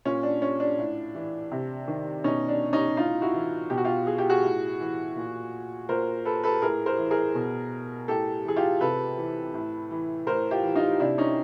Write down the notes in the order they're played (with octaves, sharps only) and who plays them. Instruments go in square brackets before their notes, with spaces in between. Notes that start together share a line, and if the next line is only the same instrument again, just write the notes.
[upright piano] A#2 C#4
D4
C#4
D4
A2
E3
C3
D#3
B2 C#4 D#4
D4
C#4 D#4
A2 D#4 F4
E4 F#4
E3
B2 G4
F#4
F4 G4
G#4
G4
F#4 G#4
A2
E3
A#2
A#2 A#4 C5
A4 B4
A4 B4
A2 G#4 A#4
A#4 C5
E3
G#4 A#4
B2
A2 G4 A4
E3 G#4
F4 G4
C3 A4 B4
E3
A2
E3
A2 A#4 C5
F4 G4
E3
D#4 F4
C3 D4 E4
C#4 D#4